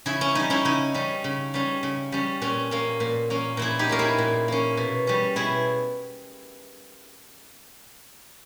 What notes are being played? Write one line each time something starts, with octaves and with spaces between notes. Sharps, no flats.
C#3 E4 G#4
C#4
G3 C#4 D#4
C#4 E4
C#3 D#4
G3 C#4
C#3
G3 C#4
C#3
G3 C#4
A#2 C#4
A#3 C#4
A#2
A#3 C#4
A#2 E4 G#4
D#4 G4
A#3 C#4 A#4
E4 G#4
A#2
A#3 C#4
B2
G3 C#4
B2 E4 G#4